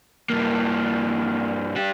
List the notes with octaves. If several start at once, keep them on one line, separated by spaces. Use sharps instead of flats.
G2 A#3
D4 G4